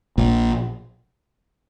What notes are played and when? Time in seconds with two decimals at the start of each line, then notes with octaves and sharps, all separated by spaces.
0.18 A#1 A#2